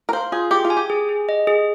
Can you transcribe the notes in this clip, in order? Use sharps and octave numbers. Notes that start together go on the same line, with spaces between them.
A#4
C5 F5
F4 G#4
G4 G#4
F4
G#5
G4
G#4
G#4
D#5
G#4